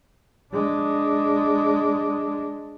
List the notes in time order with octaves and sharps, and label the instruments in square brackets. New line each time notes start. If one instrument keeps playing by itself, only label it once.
[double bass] G#3 D4